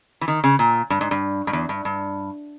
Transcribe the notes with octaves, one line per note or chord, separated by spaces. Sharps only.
E3
D#3
C#3
A#2
G2
G#2
G2
G2
E2
G2
G2